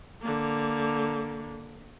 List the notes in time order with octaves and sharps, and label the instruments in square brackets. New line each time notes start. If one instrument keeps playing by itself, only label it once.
[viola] D3 A#3